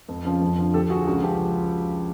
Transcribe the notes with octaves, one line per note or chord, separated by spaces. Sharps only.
F2
C#3 F3
F2
D3 F3
D2 G4 A4
D3 F3 F#4 G#4
C#2 F#4
C#3 F3 G4